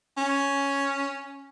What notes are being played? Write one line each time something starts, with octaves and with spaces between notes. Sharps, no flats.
C#4